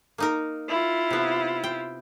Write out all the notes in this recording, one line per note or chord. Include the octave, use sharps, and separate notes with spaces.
A#3 D#4 A#4
E4 F4
C3 B3
G5